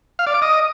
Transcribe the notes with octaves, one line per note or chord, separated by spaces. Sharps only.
F5
D5
D6
D#5